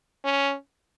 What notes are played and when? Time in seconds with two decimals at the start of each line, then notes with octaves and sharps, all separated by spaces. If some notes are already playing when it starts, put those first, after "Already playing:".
0.25 C#4